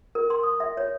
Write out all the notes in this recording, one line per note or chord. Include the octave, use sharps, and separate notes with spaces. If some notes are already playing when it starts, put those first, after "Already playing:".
A#4
C6
D#6
E5
C#5